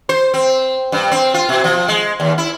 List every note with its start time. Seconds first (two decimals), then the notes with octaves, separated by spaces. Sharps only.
0.09 C5
0.34 C4
0.92 G2
1.12 C4
1.34 F4
1.49 B2
1.64 F3
1.88 G#3
2.20 D#2
2.38 E4